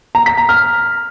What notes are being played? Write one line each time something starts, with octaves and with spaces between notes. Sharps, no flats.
A#5
B6
A#5
F6